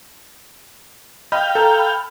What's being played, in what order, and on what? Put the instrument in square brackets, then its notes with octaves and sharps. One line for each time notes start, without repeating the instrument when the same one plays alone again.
[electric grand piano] D#5 B5 [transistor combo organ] F5 G5
[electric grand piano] A4 [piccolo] A#5
[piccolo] B5